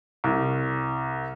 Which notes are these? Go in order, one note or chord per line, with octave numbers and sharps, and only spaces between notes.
C2